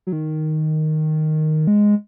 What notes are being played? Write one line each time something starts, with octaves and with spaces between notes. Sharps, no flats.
F#3
D#3
G#3